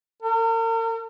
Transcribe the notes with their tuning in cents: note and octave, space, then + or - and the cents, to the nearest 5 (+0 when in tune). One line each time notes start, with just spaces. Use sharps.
A#4 -40